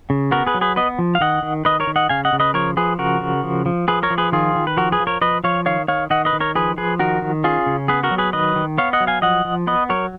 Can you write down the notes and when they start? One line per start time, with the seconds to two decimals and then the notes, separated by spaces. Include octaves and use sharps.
0.10 C#3
0.31 B3 F#4 A#4
0.46 G#4 B4
0.54 F#3
0.61 G#4 B4
0.76 B3 B4 D#5
0.99 F3
1.15 F5
1.20 D#3 D#5 F#5
1.43 D#3
1.65 D#3 B4 D#5
1.80 A#4 C#5
1.87 D#3
1.96 D#5 F#5
2.09 C#3 F5 G#5
2.25 D#5 F#5
2.33 C#3
2.40 B4 D#5
2.54 F3 A#4 C#5
2.77 F3 G#4 B4
2.98 C#3 F#4 A#4
3.21 C#3
3.44 F3
3.66 F3
3.88 F3 G#4 B4
4.03 A#4 C#5
4.10 F3
4.18 G#4 B4
4.32 D#3 F4 G#4
4.55 D#3
4.67 B4
4.77 F3 F#4 A#4
4.92 G#4 B4
5.00 F3
5.07 A#4 C#5
5.21 F3 B4 D#5
5.44 F3 C#5 F5
5.66 D#3 C#5 F5
5.88 D#3 C#5 F5
6.10 D#3 D#5 F#5
6.25 B4 D#5
6.33 D#3
6.40 A#4 C#5
6.55 F3 G#4 B4
6.77 F3 G#4 B4
6.99 D#3 F#4 A#4
7.22 D#3
7.44 C#4 F4 G#4
7.66 C#3
7.88 B3 G#4 B4
8.03 F#4 A#4
8.11 F#3
8.18 G#4 B4
8.33 D#3 B4 D#5
8.56 D#3
8.78 B3 C#5 F5
8.93 D#5 F#5
9.00 F#3
9.07 F5 G#5
9.22 F3 D#5 F#5
9.45 F3
9.67 B3 B4 D#5
9.89 F#3 A#4 C#5